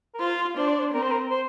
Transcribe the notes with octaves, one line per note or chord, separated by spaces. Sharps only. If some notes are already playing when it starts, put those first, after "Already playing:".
A#4
F4 C5
D4 C5
D5
C5
C4 A#4
C5
A#4
C5